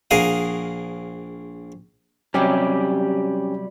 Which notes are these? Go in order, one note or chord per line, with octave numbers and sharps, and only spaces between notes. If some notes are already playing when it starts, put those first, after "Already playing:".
A#1 G#4 A#4 F5 F#5 D#6
C3 F#3 G3 C#4 G4